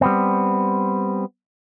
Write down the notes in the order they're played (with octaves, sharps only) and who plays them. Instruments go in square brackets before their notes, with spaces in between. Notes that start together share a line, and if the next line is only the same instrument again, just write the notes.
[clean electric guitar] G3 B3 C4